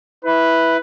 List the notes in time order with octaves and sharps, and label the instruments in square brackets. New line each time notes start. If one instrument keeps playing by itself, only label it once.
[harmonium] E4 [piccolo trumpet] B4